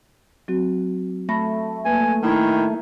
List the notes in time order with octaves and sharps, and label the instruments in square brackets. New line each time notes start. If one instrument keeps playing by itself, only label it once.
[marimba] F#3 C4 F#4
[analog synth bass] A3 [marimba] B5 A#6
[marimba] A#3 B4 [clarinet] G#5
[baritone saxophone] D#3 [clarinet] E4